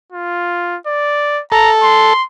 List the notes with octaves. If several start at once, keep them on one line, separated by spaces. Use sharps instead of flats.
F4
D5
A4 A#5
C6